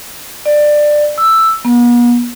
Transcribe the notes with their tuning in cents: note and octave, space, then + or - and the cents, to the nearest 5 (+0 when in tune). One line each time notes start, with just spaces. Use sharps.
D5 +15
E6 +5
B3 -45